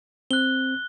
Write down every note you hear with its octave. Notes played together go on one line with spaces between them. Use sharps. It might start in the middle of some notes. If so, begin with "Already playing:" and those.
C4 F#6 G7